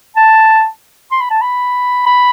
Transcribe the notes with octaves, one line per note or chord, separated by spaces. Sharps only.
A5
C6
B5
A5
B5
B5